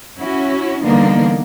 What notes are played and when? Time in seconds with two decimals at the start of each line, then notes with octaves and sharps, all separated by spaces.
0.18 C#4 E4 F#4
0.84 D3 E3 G3 A#3 B3 D#4